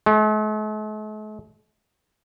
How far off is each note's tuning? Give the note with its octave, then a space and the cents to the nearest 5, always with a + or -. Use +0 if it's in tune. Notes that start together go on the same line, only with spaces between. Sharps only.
A3 -45